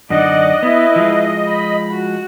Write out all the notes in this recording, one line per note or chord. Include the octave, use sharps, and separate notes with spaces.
F#2 D3 D#4 D5 D#5 F#5
B3 E4 B4
F3 G#3
B5
F#4